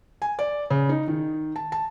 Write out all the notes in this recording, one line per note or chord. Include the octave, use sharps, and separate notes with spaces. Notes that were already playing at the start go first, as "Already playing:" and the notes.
G#5
D5
C#3
D#4
D#3
A5
A5